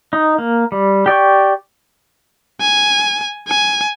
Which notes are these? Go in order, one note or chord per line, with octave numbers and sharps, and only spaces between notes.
D#4
A#3
G3
G4 D5 G5 C#6
G#5
G#5